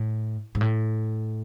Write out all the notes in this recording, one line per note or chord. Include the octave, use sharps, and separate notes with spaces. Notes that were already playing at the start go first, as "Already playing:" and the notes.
Already playing: A2
G#2
A2